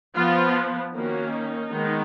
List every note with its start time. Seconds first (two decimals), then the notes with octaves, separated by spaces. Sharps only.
0.15 F3 B3 F4
0.93 D#3 A#3 C#4 F#4
1.32 D#4
1.72 D#3 G#3 B3